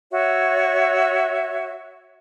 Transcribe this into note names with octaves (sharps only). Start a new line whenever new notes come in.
F#4 C#5 E5